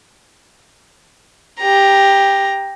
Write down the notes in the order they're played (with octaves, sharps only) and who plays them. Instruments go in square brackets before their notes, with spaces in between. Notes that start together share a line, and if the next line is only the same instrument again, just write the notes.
[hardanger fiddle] G4 A#5